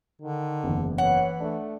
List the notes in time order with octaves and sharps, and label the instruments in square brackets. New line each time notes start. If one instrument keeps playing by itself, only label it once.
[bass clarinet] D3 [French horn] D#3
[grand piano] F#1 E2
[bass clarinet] E3 [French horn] C#5 [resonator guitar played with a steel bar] F#5
[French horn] A3 [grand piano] D4